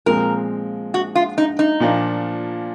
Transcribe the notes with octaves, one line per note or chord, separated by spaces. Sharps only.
A#2 F3 G#3 C4 A#4
F#4
F4
D#4
D#4
A#2 F3 A#3 D4